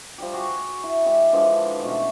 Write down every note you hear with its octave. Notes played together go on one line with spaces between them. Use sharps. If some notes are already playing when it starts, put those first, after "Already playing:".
F3 G3 G4
F#4 G#4
E4
G#3 G4 D5 E5
D3 E3 F3 G#3
B2 A3 C#4